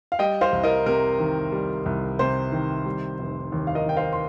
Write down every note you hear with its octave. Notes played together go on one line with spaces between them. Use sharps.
F5
G3 D#5 G5
C5 F5
C2
A#4 D#5
C3 A#4
D#3
G3
C2
C3 C5
D#3
G3
F1
D#2
F5
A#4 D#5
D#3 G5
C5 F5
C6